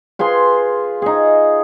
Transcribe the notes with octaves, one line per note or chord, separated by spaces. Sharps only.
F4 G#4 B4 C6
D#4 G#4